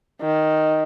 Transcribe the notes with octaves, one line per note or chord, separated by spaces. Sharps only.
D#3